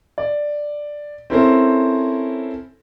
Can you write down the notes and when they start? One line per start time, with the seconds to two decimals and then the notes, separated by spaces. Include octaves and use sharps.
0.18 D5
1.30 C4 C#4 E4 A4 A#4 C5